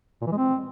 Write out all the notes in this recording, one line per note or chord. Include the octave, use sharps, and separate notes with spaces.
A#2
E3
G#3
C4